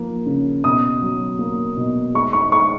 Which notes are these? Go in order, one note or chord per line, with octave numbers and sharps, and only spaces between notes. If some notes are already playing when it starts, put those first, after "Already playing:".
Already playing: F3 A#3
C#3
B2 D#6
F#3
A#3
B2
G#3 C#6
C#6
G#3 C#6